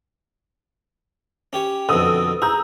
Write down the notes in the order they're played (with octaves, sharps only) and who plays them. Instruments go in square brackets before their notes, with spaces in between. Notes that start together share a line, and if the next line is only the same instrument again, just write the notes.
[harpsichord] C#4 G4 C#5
[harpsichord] F2 B2 D3 [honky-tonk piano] D#6 E6
[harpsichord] G#4 [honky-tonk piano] A#5 E6 G6